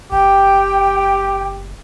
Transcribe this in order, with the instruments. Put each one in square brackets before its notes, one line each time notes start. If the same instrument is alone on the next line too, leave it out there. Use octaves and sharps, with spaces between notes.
[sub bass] F#1 [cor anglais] G4 [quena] G5